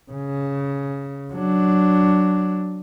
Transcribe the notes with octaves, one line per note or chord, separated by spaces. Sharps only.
C#3
F#3 D4